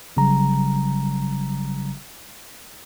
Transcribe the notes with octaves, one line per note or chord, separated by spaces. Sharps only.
G1 C#3 F#3 G3 A#5